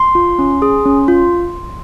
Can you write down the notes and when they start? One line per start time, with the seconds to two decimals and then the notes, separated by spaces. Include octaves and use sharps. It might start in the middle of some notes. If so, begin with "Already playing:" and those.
Already playing: C6
0.15 F4
0.39 C#4
0.62 G#4
0.85 C#4
1.08 F4